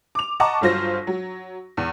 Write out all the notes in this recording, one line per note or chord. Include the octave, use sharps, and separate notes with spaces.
D6 F7
D#5 F#5 A5 A#5 C#6 D6
G1 F#3 F4 C5 A#6
F#3
E2